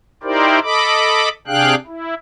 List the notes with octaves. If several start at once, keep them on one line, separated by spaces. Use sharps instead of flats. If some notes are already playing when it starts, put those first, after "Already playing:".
D#4 E4 G4 A#4 C5 D5
A4 D#5 B5 D6
C3 D4 G#4 F5 G5 F#6
E4